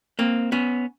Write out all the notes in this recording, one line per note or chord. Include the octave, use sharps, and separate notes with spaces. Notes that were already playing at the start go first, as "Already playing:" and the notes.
A#3 C4
B3 C#4